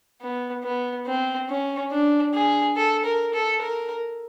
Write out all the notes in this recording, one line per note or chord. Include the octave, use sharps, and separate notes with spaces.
B3
B3
C4
C#4
D4
G#4
A4
A#4
A4
A#4